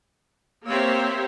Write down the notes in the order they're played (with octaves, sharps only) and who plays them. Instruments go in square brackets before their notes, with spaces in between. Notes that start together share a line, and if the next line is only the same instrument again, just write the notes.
[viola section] A#3 C4 G4 C5 C#5 E5